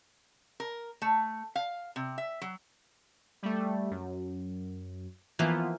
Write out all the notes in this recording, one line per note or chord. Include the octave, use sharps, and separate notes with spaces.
A#4
A3
F5
C3
E5
F#3
G3 A3
F#2
E3 F3 A#3 B3 F4